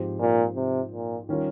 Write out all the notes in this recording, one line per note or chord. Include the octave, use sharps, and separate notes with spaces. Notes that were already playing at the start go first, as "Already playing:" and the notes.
Already playing: G#2 F3 C4 G4 C5
A#2
C3
A#2
D#3 G3 C#4 F4 A#4